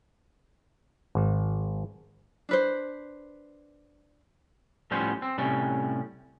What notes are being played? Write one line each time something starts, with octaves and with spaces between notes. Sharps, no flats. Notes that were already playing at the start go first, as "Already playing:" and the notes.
G#1
D4 B4 C5
A2 F3 G3 B3 C#4 C5
C4
A2 C3 G3 C#4